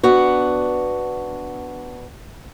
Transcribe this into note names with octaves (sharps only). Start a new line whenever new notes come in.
B3 D4 F#4